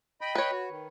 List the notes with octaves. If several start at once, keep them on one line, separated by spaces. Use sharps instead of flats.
D#5 G5 B5
B4 C#5
F#4
D#3